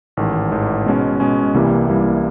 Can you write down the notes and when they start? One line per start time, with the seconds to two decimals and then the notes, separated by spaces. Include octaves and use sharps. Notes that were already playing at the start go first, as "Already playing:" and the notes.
0.17 A1 G#2 D#3
0.51 A1 G#2 D#3
0.86 B2 G#3 C#4
1.20 B2 G#3 C#4
1.54 C2 C3 E3 G3 A#3
1.88 C2 C3 E3 G3 A#3